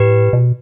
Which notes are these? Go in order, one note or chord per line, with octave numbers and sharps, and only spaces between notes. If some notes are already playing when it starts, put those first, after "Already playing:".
Already playing: A2 G4 B4
B2